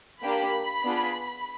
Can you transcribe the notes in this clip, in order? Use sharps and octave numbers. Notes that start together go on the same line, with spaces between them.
A#3 D4 G4 B5
B3 D4 F4 G#4